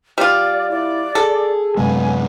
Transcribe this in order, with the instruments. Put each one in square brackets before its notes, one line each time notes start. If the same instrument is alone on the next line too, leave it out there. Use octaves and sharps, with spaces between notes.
[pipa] G3 F4 [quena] D5
[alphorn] E4 [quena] D5
[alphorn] G#4 [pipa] A4
[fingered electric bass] F#2 C3 G#3 [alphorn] B3 [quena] G#5